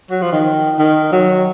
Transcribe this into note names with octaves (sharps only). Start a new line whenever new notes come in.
F#3
F3
D#3
D#3
F#3